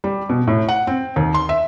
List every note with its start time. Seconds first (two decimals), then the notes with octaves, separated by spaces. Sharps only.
0.04 G3
0.29 B2
0.47 A2
0.68 F#5
0.87 C4
1.16 D#2
1.34 C6
1.49 E5